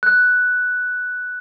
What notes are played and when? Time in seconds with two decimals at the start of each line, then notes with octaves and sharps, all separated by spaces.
0.03 F#6